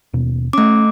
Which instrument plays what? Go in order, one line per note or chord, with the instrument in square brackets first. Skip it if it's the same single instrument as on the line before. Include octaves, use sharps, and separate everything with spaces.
[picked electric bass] D#2 B2
[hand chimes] A3 D6 [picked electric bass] C#4